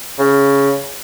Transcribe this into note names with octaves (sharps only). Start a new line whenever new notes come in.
C#3